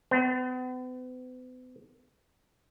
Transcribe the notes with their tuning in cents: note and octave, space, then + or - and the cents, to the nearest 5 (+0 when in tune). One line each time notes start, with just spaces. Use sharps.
B3 +45